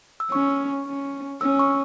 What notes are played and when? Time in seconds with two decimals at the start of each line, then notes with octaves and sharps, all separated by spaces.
0.20 E6
0.31 C#4 C#6
0.86 C#4
1.41 C#4 E6
1.59 C#6